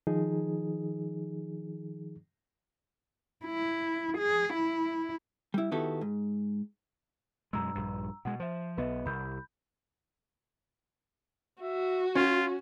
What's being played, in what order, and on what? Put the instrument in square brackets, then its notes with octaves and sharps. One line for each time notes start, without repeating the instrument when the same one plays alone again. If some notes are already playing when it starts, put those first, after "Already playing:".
[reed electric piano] D#3 F3 D#4 G#4
[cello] E4
G#4
E4
[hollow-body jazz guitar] G3 E4
D#3 B3 E4 F#4 G4 A4
G#2
[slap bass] F#2 B2 G#3 [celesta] A#5 E6
[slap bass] A#1 G2
[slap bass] B2 G#3 [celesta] F#5
[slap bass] F3 [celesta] C5 E5
[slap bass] B1 B3 [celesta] B4 D#5 E5
[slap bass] C2 [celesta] B5 G6
[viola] F#4 [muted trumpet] E5
[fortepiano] C#4 [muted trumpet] F4